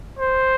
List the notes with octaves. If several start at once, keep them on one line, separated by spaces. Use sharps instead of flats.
C5